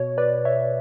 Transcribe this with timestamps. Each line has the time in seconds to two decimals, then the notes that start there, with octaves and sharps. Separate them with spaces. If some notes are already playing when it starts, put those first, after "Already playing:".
Already playing: B2 C#5
0.18 B4 D5
0.45 C#5 E5